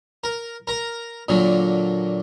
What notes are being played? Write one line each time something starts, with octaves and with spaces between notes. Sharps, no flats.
A#4
A#4 A#5
A#2 D3 F#3